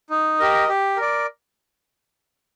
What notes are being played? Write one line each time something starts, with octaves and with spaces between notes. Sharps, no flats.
D#4
G4 A#4 D#5
G4
A#4 D5